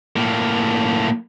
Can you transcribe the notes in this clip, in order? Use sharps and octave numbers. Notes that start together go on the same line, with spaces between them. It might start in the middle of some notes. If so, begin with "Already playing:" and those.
A2 A#3